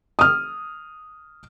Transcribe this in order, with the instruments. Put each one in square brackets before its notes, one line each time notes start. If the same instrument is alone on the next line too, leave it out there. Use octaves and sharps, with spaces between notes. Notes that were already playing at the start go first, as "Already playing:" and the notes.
[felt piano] D#6 F6